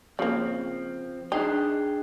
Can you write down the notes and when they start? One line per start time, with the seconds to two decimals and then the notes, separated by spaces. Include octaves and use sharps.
0.19 C#3 F3 A#3 C4
1.32 D4 D#4 G#4 G5